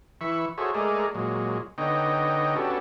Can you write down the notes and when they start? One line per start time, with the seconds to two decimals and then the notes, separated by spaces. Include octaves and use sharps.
0.21 E3 E5 B5 C#6
0.58 F#4 G#4 A4 C5 C#5 E5
0.75 G#3 A3 G#4 A#4 D5 D#5
1.15 A#2 F#3 G#3
1.78 D3 B3 D#4 C#5 D#5 G5
2.56 B3 C#4 D4 F#4 G4 A4